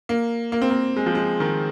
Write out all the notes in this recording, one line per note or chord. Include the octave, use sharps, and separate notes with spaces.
A#3
A#3
C4
A#3
G#3
F3
G#3
D#3